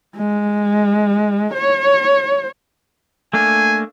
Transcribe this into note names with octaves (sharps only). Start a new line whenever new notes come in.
G#3
C#5
A3 A#3 D4 G#5